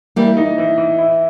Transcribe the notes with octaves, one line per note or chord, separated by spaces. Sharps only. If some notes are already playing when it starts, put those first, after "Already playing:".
E3 G3 A#3
D#4
E3
E3
E4